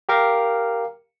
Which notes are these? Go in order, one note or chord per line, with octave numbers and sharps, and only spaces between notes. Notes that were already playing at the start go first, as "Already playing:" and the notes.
G4 A#4 F5